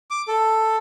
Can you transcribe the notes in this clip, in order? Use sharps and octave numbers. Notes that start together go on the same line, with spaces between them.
D6
A4